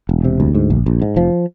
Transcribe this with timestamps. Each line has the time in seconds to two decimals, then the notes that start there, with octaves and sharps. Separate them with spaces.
0.09 E1
0.24 C3
0.40 D2
0.55 G#2
0.70 A#1
0.86 A#1
1.02 G#2
1.16 F1 F3